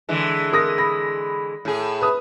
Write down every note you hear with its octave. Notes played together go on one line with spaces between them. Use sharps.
D3 E3 G#3
A#4 D#6 A#6
B5 A#6
A2 G#4
B4 D#6